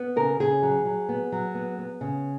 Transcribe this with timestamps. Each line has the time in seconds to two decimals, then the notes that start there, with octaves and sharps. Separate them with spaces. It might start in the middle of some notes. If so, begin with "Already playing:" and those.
Already playing: B3
0.16 C#3 A#4
0.40 C#3 G#4
0.63 F#3
0.85 F#3
1.09 B3
1.32 F#3
1.55 B3
1.79 B3
2.01 C#3